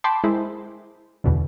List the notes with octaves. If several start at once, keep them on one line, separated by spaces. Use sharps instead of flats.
G5 A5 B5 C6 D6
G#3 E4 A#4 C5
E2 B2 D3